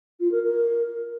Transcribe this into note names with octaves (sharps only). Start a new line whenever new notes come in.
F4
A#4
A#4